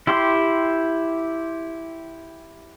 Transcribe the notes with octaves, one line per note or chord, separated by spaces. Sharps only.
E4 G4 C6